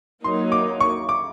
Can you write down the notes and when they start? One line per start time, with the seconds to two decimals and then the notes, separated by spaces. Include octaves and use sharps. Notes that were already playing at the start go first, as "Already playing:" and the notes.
0.24 F#3 A#3 D#4 C6
0.52 D6
0.81 C#6
1.09 D6